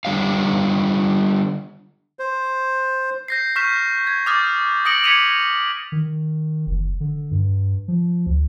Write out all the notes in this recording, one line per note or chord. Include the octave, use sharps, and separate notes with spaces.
D3 G3 C#5 F5
C5
G6 A#6 C7
C#6 F6 G6 B6 E7
G#6
D6 D#6 F6 G6 A6
D#6 A#6 C#7 D7 F#7
D6 G#6 B6 C#7 D#7 F7
D#3
F#1
D3
G2
F3
D2